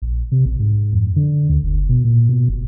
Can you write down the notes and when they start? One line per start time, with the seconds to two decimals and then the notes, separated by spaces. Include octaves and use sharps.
0.02 A#1
0.32 C3
0.46 A#1
0.59 G#2
0.93 F2
1.16 D3
1.49 D2
1.63 F#1
1.89 B2
2.04 A#2
2.29 B2
2.49 G1